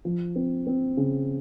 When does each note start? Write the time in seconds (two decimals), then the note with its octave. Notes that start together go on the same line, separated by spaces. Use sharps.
0.05 F3
0.36 C4
0.67 C4
0.97 C#3